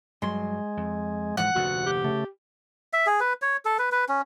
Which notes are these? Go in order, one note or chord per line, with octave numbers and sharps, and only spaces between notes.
G2 F#3 G#3 C6
F2
G#2 E3 F3 F#5 F#6
F1 D2 A#2 F#4
G4
C#3 A3
E5
G#4
B4
C#5
A4
B4
B4
C#4